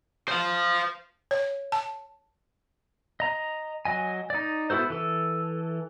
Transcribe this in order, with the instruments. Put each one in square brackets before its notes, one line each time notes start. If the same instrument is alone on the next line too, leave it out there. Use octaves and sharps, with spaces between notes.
[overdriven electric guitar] C5 F5
[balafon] C#5
A5
[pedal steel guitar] D#5 A#5
F#3 D#5 G#5
D#4 D5
B3 E4 F#4 A4 C5
E3 A4